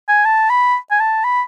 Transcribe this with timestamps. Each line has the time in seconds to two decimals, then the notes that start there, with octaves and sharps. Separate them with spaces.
0.08 G#5
0.25 A5
0.50 B5
0.91 G#5
1.00 A5
1.24 B5